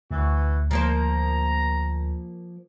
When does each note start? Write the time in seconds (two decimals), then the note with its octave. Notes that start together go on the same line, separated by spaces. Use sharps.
0.11 D2 E3 F#4
0.71 F3 A#3 C5 A#5